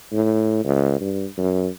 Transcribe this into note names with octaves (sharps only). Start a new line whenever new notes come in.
A2
C#2
G2
F#2